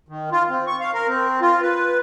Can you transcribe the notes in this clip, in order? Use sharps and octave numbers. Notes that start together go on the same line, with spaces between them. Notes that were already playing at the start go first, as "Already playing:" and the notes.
D#3
F4
C4
C#6
F5
A#4
C4
F4
B4